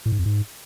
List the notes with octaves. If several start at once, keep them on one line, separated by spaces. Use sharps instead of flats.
A2
G#2
F2
G#2